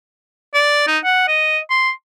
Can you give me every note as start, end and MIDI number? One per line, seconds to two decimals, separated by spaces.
0.54 0.86 74
0.87 0.98 63
1.04 1.27 78
1.28 1.59 75
1.70 1.90 84